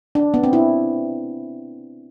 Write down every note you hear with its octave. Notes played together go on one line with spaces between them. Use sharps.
D4
B3
C4
E4